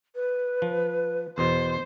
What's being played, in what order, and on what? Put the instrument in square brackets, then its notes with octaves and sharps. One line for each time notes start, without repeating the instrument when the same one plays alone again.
[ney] B4
[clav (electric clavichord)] F3
[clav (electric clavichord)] E2 B2 [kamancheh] C5